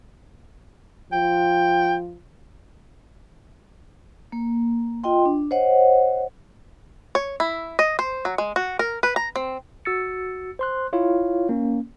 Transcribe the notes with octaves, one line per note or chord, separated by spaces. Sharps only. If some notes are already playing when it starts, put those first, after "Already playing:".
F3 G5
A#3
F4 D#5 G5 C6
D4
C5 C#5 D#5 F#5
C#5
E4
D#5
C5
F#3
G#3
F#4
A#4
B4
A#5
C4
F#4 E6 A6 C#7
C5 C6 F#6
E4 F4 C#5 F5
A#3 C#4